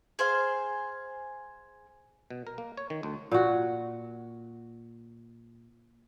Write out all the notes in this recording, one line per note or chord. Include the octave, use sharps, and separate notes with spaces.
G#4 C5 F5
B2
A#4
A#3
C#5
D#3
D2
A#2 F#4